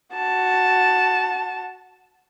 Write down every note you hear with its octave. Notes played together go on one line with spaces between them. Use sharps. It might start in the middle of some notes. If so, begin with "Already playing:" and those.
F#4 A5